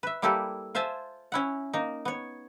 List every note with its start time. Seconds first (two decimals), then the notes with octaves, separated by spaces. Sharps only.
0.03 B4 E5
0.22 G3 A#3 E4 G4 A4 B4
0.75 F4 C5 E5 G#5 A5
1.32 C#4 E4 F#5
1.73 A#3 D#4
2.05 B3 C#5